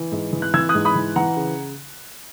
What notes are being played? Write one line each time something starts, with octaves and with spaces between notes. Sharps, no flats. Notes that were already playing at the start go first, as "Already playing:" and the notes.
Already playing: E3
G#2
E3
F#6
E3 E6 G#6
D#6 F#6
G#2
B5 D#6
E3
E3 F#5 A#5
C#3